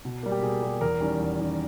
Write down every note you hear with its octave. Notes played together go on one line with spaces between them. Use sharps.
B2
G3 A#3
G4
B2 G#4
G3 A#3
E2 A#4
D#3 G3 C#4
E2
D#3 G3 C#4